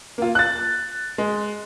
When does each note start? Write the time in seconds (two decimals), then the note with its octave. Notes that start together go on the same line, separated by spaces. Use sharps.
0.18 A#3 F4
0.35 F#6 A6
1.18 G#3